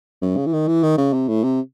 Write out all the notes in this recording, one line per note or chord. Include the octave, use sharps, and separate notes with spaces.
F#2
C#3
E3
D#3
E3
D#3
C#3
C3
A2
C3